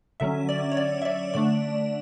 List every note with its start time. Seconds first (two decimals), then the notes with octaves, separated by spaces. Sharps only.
0.20 D3 F#3 C#4 E5
0.49 D5
0.72 C#5
0.77 D5
1.02 E5
1.05 D5
1.34 D3 A3 D4 D5